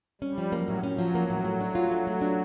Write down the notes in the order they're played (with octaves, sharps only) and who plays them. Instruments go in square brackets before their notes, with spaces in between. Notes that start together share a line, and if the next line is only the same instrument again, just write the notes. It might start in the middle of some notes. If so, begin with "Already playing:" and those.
[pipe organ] G3 [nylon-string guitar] C#4
[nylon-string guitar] F3
[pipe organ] F#3 [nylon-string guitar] A#3
[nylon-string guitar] A2
[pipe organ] F#3 [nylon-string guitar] C#4
[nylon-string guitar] F3
A#3
A2
A3
D4
F4
A3
A3
D4